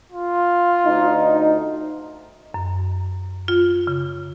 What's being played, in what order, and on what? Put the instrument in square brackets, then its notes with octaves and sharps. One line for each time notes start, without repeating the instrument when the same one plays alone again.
[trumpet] F4
[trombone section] D2 D#4
[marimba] F#2
F4
C#3